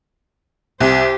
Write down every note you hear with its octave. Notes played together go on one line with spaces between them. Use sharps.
C2 G4 C5